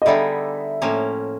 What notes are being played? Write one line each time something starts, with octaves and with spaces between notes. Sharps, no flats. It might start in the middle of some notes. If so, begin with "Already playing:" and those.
D#5
D3 G3 B3 D#4 G#4 D5 E5
A2 F3 A#3 C#4